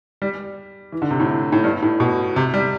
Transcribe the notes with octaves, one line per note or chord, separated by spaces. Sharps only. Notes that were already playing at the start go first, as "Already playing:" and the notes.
G3
E3
D3
C3
A2
A2
G2
A2
B2
C3
G3